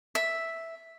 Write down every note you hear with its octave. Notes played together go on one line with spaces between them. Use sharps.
E5